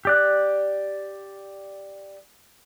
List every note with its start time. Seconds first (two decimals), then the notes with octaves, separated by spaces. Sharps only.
0.05 G4 D5 F#6